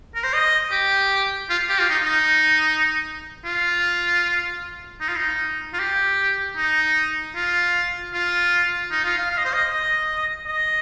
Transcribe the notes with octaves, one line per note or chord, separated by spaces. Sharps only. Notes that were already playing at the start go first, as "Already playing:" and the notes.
A#4
C5
D#5
G4
F4
G4
F4
D#4
D#4
F4
D#4
F4
D#4
F4
G4
D#4
F4
F4
D#4
F4
F5
F5
D#5
C5
D#5
D#5
D#5